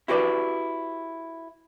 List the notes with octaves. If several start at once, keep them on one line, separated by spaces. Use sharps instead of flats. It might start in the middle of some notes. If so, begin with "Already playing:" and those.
E4 F#4 G4 B4 D5